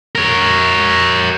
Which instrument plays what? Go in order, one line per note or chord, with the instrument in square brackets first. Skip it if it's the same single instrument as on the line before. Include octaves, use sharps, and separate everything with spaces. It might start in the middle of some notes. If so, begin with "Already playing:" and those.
[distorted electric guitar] A#4 C#5